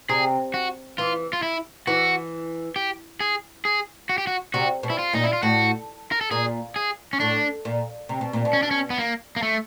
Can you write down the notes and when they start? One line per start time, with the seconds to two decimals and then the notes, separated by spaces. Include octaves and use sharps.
0.09 C3 G#4
0.54 F#4
0.98 E3 F4
1.33 F4
1.43 E4
1.87 E3 F#4
2.76 G4
3.20 G#4
3.65 G#4
4.09 F#4
4.18 G4
4.27 F#4
4.54 C3 F#4
4.83 B2
4.90 E4
4.99 F4
5.13 A#2 D#4
5.24 E4
5.33 F4
5.43 A2 F#4
6.12 A#4
6.21 A4
6.31 A#2 G#4
6.76 G#4
7.13 C#4
7.20 A2 D4
7.65 A#2
8.09 C3
8.21 B2
8.33 A#2
8.45 B2
8.53 C#4
8.63 D4
8.71 C#4
8.90 B3
8.98 A#3
9.36 A#3
9.43 A3